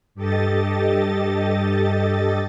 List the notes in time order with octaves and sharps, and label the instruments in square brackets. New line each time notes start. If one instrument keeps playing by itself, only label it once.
[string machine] G2 G4 A4 D#5 A6